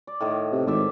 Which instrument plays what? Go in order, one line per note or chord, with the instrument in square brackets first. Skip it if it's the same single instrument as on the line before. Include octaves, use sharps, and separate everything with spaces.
[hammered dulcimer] D5
A2 D#3
[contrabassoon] C3
[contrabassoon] G#1 [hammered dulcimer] C5 D5 E5